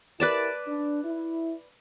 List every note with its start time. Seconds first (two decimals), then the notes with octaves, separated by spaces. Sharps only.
0.20 E4 G4 A#4 B4 D5 A5
0.67 D4
1.04 E4